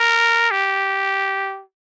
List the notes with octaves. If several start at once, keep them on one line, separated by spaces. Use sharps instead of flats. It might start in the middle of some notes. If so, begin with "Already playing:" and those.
Already playing: A#4
G4